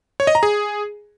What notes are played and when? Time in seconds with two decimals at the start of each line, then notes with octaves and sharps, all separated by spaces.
0.20 C#5
0.27 D#5
0.35 A#5
0.43 G#4